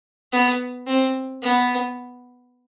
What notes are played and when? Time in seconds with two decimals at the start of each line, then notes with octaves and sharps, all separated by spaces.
0.33 B3
0.87 C4
1.43 B3